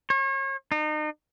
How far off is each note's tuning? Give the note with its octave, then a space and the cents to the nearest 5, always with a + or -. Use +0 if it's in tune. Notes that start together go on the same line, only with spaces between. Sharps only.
C#5 -35
D#4 -35